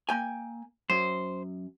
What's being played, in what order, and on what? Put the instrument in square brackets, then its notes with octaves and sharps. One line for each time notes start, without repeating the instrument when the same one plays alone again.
[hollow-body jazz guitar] A#3 G5 G#5
[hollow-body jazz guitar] F#2 [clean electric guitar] C5